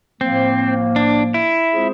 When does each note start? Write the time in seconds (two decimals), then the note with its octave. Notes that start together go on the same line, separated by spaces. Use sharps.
0.21 A2 F3 A#3 C4
0.96 D4
1.34 E4
1.71 G#3 C4 F4 G#4 C5